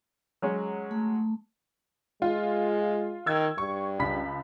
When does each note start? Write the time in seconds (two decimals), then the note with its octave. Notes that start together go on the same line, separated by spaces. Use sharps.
0.42 F#3 G#3 C#4
0.91 A3
2.22 G#3 F4
3.26 D#3 E6 G#6
3.58 G2 C#6
3.99 C#2 B5 B6